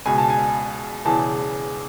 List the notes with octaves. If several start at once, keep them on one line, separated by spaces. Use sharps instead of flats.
C#2 B2 G#5
A5
G#5
E1 E2 C#3 E3 A5